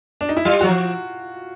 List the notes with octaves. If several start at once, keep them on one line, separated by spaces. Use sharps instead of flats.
D4
D#4
E4
G3 F4
F#3 F#4
F3